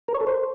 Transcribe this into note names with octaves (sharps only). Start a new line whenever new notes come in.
A#4
C#5
A4
C5